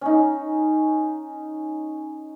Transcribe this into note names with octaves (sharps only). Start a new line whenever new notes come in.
C#4 D#4